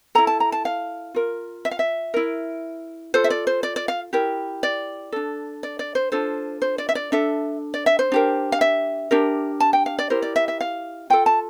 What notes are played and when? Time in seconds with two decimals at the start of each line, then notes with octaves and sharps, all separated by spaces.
0.15 E4 A4 A#5
0.27 A5
0.40 A#5
0.52 A5
0.65 F5
1.15 F4 A#4
1.65 E5
1.71 F5
1.79 E5
2.14 E4 A#4
3.14 F4 A4 C5
3.24 E5
3.30 D5
3.47 C5
3.63 D5
3.76 D5
3.88 F5
4.13 E4 G4 A#4
4.63 D5
5.12 D4 A4
5.63 D5
5.79 D5
5.95 C5
6.12 D4 F4 A4 C5
6.62 C5
6.78 D5
6.89 E5
6.95 D5
7.12 D4 A4 E5
7.74 D5
7.86 E5
7.99 C5
8.12 D4 G4 A#4
8.52 F5
8.61 E5
9.11 D4 G4 A#4
9.60 A5
9.73 G5
9.86 F5
9.99 D5
10.10 E4 G4 A#4 C5
10.22 D5
10.36 E5
10.48 E5
10.61 F5
11.10 F4 A4 G5
11.26 A5